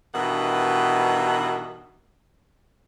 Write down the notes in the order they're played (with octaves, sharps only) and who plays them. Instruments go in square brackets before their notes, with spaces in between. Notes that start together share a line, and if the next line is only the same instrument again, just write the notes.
[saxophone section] G2 B2 D#3 E3 F#5